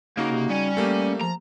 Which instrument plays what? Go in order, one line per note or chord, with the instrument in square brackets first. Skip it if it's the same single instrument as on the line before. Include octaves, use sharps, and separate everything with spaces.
[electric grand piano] C#3 D#4 F#4 [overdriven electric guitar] A#3
[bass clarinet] C3
[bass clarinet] G3 [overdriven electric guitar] C#4 G#5
[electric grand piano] A3 A#3 G4
[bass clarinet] F3 [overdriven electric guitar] A#5